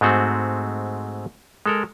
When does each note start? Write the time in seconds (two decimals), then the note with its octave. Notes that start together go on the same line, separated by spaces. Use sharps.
0.01 G#2 G#3 A3 C4 F#4
1.66 G#3 A4 A#4